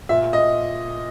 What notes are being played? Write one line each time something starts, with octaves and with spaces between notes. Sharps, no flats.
A#2 E5
D#5